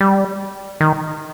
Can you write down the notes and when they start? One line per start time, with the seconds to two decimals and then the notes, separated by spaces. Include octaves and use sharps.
0.01 G3
0.81 D#3